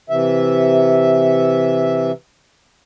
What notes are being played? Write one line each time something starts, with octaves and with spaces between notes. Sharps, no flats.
C3 E3 E5